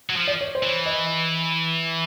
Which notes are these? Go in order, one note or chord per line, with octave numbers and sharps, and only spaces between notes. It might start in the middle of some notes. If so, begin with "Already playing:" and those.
F#3
F3
D5
C#5
C5
E3
D#5